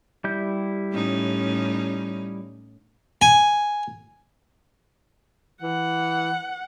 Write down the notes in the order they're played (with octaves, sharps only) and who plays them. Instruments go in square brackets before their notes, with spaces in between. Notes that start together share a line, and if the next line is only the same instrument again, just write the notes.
[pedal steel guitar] G3 E4 G6
[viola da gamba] A2 C#4 D#4
[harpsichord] G#5
[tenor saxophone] E3 [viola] F#5